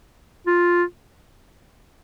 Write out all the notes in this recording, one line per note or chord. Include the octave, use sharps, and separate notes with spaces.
F4